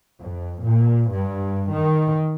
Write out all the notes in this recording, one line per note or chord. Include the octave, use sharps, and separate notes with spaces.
F2
A#2
G2
D#3